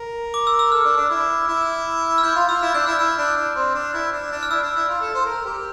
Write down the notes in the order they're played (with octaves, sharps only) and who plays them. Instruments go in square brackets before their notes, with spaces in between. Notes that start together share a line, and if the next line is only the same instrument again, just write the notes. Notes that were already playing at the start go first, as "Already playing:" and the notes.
Already playing: [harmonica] A#4
[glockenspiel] D6
E6
E6
[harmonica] A4 [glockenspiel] F6
[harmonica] D4
D4
E4
E4
[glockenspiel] F6
[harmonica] E4 [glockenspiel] G6
[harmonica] F4 [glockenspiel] F6
[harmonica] F4 [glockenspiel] E6
[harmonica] E4 [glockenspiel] F6
[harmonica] D4 [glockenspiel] G6
[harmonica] E4 [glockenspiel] F6
[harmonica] E4 [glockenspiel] F6
[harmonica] D4
D4
C4
D4
E4
D4
D4
[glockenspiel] F6
[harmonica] E4 [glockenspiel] E6
[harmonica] D4
E4
F4
A4
C5
A#4
G4